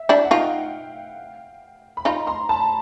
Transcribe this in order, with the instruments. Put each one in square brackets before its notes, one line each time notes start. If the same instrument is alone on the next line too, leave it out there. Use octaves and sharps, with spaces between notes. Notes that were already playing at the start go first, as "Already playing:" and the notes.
Already playing: [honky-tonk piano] E5
[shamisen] D4 E4
[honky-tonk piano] F#5
[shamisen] D#4 F4 [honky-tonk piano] F5 G5
[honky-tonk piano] B5
[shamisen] D#4 F4 [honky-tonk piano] A#5 C6
[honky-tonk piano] A#5 C6
A5 B5